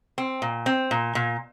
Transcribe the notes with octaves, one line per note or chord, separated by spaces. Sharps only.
C4
A#2
C4
A#2
A#2